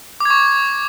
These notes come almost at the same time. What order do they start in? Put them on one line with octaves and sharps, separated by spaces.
D6 G#6 C#6